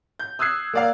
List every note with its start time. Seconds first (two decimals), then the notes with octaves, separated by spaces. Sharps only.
0.19 G6
0.39 D#6 E6 F#6 G#6 C7
0.73 A#3 D5 F5